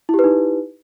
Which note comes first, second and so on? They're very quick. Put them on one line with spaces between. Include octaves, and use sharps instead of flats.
E4 G4 B4 D#4